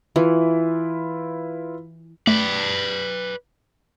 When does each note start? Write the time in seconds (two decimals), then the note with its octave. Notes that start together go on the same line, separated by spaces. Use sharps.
0.16 E3 E4 F4 B4
2.27 A3 B4 D5